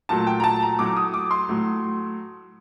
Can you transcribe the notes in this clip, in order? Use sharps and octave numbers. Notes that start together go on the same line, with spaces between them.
A#2 F#3 A3 A5
G5
A#5
A5
A#5
A2 F#3 A3 D6
D#6
D6
C6
A2 F#3 A3